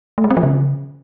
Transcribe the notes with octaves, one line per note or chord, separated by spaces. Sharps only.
A3
G#3
C4
F3
C#3